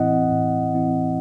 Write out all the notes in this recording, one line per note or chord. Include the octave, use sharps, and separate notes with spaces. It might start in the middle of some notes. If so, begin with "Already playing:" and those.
Already playing: A2 E3 C4 E4 D#5 F#5
A2
E3 C4 E4